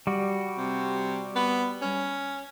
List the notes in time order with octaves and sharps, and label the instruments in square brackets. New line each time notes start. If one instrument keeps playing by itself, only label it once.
[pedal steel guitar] G3 F#4
[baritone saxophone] C3
B3
C#4